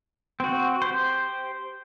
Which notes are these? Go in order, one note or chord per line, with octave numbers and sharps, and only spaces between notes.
C4 F#4
G4 C5